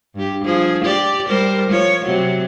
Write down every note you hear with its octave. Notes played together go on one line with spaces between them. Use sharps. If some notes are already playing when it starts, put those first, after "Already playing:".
G2 G4
F3 G#4
G4 D5
G3 A#4 C5
F3 C#5
C3 F#3